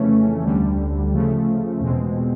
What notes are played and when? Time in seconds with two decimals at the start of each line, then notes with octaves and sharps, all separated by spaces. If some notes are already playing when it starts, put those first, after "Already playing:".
Already playing: F2 C#3 E3 A3 C#4
0.43 D2 D3 G3
1.12 C#3 F3 A3
1.80 E2 B2 G#3 C4